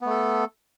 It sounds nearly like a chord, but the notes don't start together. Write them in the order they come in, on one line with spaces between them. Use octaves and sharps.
B3 A3 A4